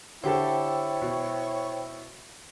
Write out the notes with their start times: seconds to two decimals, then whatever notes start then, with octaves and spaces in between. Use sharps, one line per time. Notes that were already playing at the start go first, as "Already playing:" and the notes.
0.24 D3 E4 G4 A4 C5 C#5 G5
1.02 B2